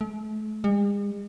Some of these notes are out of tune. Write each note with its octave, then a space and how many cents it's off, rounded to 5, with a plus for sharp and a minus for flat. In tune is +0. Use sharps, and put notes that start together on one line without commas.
A3 -40
G#3 -45